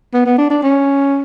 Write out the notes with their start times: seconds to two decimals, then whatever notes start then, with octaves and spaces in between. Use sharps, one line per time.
0.14 B3
0.26 B3
0.38 D4
0.50 D4
0.63 C#4